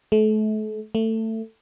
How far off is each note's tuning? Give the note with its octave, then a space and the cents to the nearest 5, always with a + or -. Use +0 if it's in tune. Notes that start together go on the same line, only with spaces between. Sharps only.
A3 -35
A3 +20